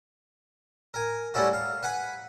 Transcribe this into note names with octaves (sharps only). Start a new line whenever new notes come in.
A#4 G#5
G3 A3 C#4 E4 F#4
F5
B4 F#5 G#5 B5